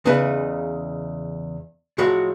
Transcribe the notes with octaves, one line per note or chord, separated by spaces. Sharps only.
E2 C#3 G#3 D#4 B4 E5
A2 F3 F#3 G#3 F#4 B5